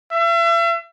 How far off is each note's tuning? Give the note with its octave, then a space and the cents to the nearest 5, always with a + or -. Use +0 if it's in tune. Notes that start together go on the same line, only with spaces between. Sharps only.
E5 +40